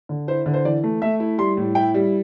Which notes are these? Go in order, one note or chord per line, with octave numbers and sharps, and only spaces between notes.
D3
E4 C5
D3
C5
E3 D5
A3
A3 E5
E4
G3 C6
A2
E4 G5
G3